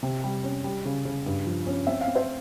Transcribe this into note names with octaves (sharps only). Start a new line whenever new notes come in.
C3
G3
C#4
G3
C#3
C#3
G2
F3
C#4
C4 E5
F5
C4
C5 E5